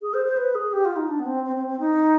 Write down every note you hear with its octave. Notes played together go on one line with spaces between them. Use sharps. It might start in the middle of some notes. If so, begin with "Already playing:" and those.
G#4
C5
C5
B4
G#4
G4
F4
D#4
D4
B3
C4
C4
C4
C4
D#4